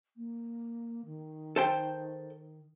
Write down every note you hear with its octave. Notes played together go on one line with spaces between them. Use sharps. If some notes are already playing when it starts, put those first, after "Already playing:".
A#3
D#3
A4 C5 G5